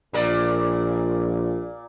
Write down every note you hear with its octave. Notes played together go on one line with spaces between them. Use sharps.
A#1 A#2 A#4 D5